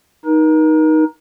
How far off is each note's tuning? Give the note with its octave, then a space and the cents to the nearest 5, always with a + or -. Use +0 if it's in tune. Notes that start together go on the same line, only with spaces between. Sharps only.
D#4 +5 A#4 +40